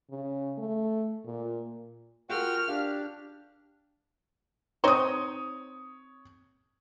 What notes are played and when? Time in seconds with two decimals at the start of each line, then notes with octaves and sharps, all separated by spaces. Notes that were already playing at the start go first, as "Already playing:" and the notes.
0.10 C#3
0.58 A3
1.25 A#2
2.30 F4 F#4 G#4 A#4 F#5 G5 F6
2.68 D4 G4 F5
4.84 C4 D#4 C5 C#5 D#6